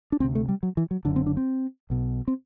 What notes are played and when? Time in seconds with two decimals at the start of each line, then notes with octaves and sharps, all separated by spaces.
0.12 D4
0.20 D2 C4
0.24 C3
0.35 A3
0.49 G3
0.63 F#3
0.77 E3
0.91 F#3
1.05 F#1 F#2 D3 D4
1.16 C4
1.27 D4
1.37 C4
1.90 B1 B2
2.28 C4